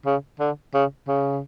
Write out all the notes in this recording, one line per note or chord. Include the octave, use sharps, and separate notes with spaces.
C#3
D3
C#3
C#3